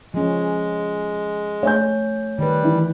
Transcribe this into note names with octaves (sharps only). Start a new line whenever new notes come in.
F3 G#3 C#4
A3 C#5 G#5 G6
D#3 G3 B4
E3